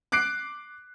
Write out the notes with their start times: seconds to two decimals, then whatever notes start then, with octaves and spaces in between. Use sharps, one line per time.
0.12 D6 F#6 C7 D7